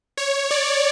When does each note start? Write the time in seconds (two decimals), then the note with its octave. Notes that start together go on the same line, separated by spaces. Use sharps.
0.17 C#5
0.51 D5